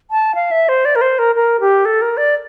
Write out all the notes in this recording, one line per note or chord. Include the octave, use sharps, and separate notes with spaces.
A5
F5
E5
C5
D5
A#4
C5
A#4
A#4
G4
A4
A#4
D5